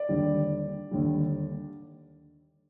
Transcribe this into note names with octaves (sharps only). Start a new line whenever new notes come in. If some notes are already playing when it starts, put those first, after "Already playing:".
Already playing: D5
D#2 D3 G3
D#2 D3 G3